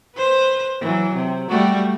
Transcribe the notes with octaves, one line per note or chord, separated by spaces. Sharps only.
B4 C5
E3 F#3
C3
G3 A3 F#4